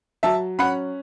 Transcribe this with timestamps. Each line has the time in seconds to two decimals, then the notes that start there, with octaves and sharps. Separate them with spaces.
0.23 F#3 E5 A5
0.58 C#4 F#5 B5